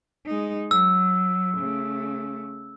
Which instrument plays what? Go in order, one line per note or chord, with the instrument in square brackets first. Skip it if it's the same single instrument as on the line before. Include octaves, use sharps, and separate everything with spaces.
[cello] G#3 D#4
[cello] F#3 [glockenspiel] E6
[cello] C#3 A3